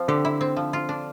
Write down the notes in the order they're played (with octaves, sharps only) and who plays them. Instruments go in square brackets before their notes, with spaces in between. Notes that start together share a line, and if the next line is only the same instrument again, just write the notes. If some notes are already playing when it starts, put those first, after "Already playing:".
Already playing: [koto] F3 C4
[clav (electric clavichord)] D3 [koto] G4
[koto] E4
C4
F3
F4
D4